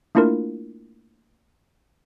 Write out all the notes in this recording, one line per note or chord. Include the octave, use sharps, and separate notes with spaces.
A3 A#3 D4 E4 F4 A#4